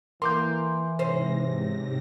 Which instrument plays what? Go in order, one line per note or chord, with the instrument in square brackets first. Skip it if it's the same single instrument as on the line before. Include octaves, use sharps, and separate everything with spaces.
[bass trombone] E3 [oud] A#3 [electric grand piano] C6 D6 G6
[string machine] G#2 C3 A#6 [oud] C#4 C5